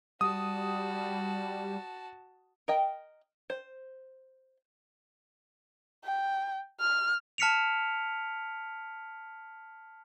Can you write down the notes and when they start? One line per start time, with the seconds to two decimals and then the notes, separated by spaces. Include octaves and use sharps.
0.21 G3 F#4 A5 D#6
2.68 A#4 D#5 G5
3.50 C5
6.04 G5
6.80 F6
7.38 A5 F6 B6 C#7 D7 F7